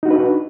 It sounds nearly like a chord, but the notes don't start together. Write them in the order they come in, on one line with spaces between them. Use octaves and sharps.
D#4 F#4 D4 B4